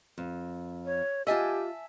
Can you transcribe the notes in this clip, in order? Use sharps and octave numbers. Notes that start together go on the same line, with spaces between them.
F2
C#5
F4 G4 D#5 E5 G#5 A5